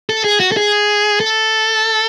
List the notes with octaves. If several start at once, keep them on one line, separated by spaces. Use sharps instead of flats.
A4
G#4
F#4
A4
G#4
A4